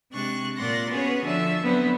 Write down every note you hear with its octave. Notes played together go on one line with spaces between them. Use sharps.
C3 G#3 D4 C#6 F#6
A#2 D5 F#5 C6 A#6
B3 C#4 F#4 G#4 B4 C#5
D3 F3 E5 A5
D3 F#3 B3 C4 B4